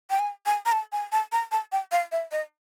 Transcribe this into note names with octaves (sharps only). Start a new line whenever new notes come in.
G5
G#5
G#5
A#5
A5
G#5
A5
A#5
A5
G5
F5
E5
D#5